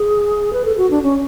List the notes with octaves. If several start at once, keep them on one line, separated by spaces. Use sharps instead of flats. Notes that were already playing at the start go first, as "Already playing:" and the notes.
Already playing: G#4
B4
A4
F#4
D4
C#4